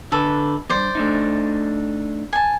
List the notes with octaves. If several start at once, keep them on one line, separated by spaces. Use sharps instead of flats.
D3 A4 B4
E2 G2 C5 D5
A3 D4 D#4
G#5 A5